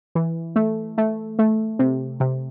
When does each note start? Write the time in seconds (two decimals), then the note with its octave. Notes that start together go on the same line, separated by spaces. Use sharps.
0.15 E3
0.56 A3
0.98 A3
1.39 A3
1.79 C3
2.20 C3